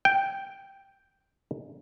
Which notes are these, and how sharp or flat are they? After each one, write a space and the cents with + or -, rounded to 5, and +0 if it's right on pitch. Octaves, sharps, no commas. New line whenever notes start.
G5 +0